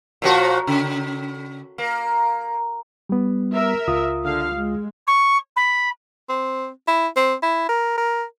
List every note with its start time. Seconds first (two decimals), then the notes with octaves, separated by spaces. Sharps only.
0.22 A#2 F3 F#4
0.67 C#3
1.78 A#3
3.09 G3 B3
3.54 A#4 E5
3.88 C#2 F4 D#6
4.24 D3 F5
4.54 G#3
5.07 C#6
5.56 B5
6.29 C4
6.88 E4
7.16 C4
7.43 E4
7.69 A#4
7.97 A#4